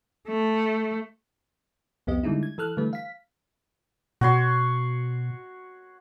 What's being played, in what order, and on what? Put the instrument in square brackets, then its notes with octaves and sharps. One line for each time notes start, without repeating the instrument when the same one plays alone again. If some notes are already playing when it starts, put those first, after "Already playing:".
[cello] A3
[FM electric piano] C2 F2 B3 G4 D#5
D3 G3 G#3 D#4 E4
G#6
E3 A4 F6 F#6
D3 E3 G3 A3 B4
F5 B6
[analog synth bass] B2 [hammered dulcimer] F#4 C#5 C6